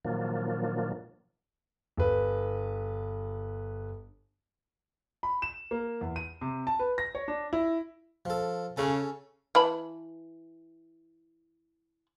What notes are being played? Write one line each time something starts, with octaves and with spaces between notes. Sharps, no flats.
A#2 D#3 F3 F#3 A#3 D4
G1 B4
B5
E7
A#3
E2
D#7
C3
A5
B4
A#6
C#5
D4
E4
F3 A4
C#3 C#4 A4
E3 A5 B5